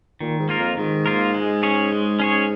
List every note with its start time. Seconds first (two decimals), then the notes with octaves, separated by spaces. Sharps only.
0.20 A#2 D#3
0.39 G#2
0.49 A#3 F4 A#4
0.59 F2
0.77 G#2 D#3
1.06 A#3 F4 A#4
1.34 G#3
1.63 C#4 G#4 C#5
1.92 G#3
2.19 C#4 G#4 C#5